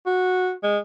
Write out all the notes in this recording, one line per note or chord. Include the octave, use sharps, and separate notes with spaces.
F#4
G#3